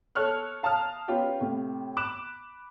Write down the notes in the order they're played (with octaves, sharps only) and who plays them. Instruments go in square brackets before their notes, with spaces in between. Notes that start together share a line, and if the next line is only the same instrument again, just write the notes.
[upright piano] A4 C#5 C#6 F6 F#6
F5 A5 A#5 D#6 F6
B3 C#4 F4 G4 G5
A2 C3
B5 D6 F#6 E7